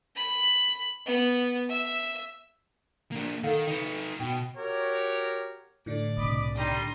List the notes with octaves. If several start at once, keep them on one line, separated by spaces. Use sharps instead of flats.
B5
B3
E5
A#3 D4
D#3 A4 F5 F#5
D#4 B4
B2 G5
F#4 G4 A#4 C#5
A2 D3 D4 D5
C2 B2 D#5 B5 D6
G3 D#4 C6